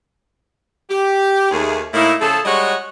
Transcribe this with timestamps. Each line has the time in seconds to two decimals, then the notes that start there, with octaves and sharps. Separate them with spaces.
0.89 G4
1.51 D#2 A3 G#4
1.94 A2 A#3 D#4 E4
2.21 C#3 F3 G#4 A4
2.45 G3 G#3 F#4 C#5 D#5 F#5